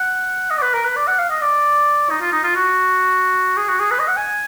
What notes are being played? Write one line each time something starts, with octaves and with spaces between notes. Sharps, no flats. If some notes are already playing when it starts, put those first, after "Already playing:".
Already playing: F#5
D#5
D5
B4
A#4
B4
D5
F#5
F5
D#5
D5
D#4
F4
D#4
F4
F#4
G#4
F#4
G#4
B4
D#5
F#5
G#5